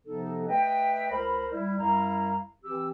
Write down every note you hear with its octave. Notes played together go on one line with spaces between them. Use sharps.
C3 F3 B3 D#4 A4
A3 B4 D#5 E5 G5
C#2 A#4 C5 B5
G3 E4
F#2 G3 E4 F5 A#5
E3 C4 G4 E6